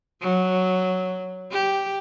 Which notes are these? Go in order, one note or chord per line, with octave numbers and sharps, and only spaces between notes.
F#3
G4